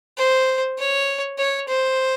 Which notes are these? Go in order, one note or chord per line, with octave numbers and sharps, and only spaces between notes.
C5
C#5
C#5
C5